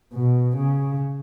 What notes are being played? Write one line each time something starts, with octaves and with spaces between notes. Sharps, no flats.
B2
C#3